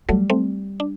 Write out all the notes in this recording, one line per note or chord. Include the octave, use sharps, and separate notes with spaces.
F#3 G3 A3
A3 C4
D4